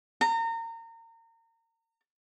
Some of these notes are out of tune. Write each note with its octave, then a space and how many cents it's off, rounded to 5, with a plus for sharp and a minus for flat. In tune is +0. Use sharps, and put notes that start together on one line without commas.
A#5 -30